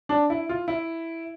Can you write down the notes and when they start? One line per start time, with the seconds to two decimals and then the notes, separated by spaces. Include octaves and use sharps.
0.09 D4
0.30 E4
0.49 F4
0.68 E4